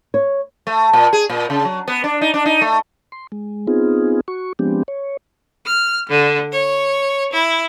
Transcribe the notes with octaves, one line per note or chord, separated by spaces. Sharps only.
C#5
A3
A#2
G#4
A#2
C#3
F#3
B3
D4
D#4
D4
D#4
A3
C6
G#3
B3 C4 D#4 F4 G#4
F#4 C#6
F3 G#3 B3 C4 D4 G4
C#5
F6
D3
C#5
E4